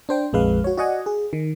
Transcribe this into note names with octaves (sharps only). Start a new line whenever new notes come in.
D4 C5 G5
A#1 F2 G#3 B4 F5
F#4 C#5
F#4 D5 D#5 F#5 G#5
G#4
D#3